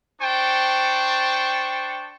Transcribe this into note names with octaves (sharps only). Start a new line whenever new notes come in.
D4 C5 G5 A5 C#6